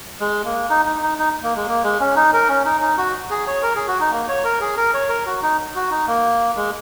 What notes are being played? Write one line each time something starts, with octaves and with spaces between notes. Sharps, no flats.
G#3
A#3
D#4
D#4
D#4
D#4
A#3
G#3
A#3
G#3
C#4
D#4
A#4
C#4
D#4
D#4
F#4
G#4
C#5
A#4
G#4
F#4
D#4
A#3
C#5
A#4
G#4
A#4
C#5
A#4
F#4
D#4
F#4
D#4
A#3
G#3